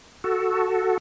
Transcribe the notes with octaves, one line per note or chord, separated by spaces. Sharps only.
F#4 A4